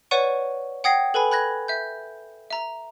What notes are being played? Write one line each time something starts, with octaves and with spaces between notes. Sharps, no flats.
B4 C#5 D5 F#5 C#6 D#7
F#5 G5 D#6 G#6 A#6 C7
A4 B4 G#5 B5
B5 F#6 G#6 A#6
E5 G6
E5 A#5